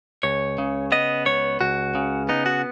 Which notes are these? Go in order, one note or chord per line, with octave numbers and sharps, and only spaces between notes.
C#2 C#5
C#3
B3 D#5
C#2 C#5
C#2 F#4
C#3
B3 D#4
F#4